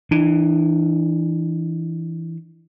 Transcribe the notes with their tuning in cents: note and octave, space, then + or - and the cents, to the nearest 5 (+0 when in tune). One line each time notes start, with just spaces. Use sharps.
E3 +0 D4 +35